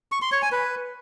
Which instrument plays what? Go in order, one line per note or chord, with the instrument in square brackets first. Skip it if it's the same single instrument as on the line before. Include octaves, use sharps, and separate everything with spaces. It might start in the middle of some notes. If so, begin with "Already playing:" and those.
[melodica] C#6
C6
C#5
G#5
B4